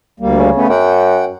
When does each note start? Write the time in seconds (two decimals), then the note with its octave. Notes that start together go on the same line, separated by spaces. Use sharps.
0.20 D2 G3 A#3
0.39 C#3
0.56 A3 B3 C#4
0.69 F#2 F#5 G5